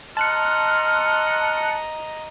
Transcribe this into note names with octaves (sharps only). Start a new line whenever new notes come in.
D#5 A5 A#5 C6 F6 F#6 C#7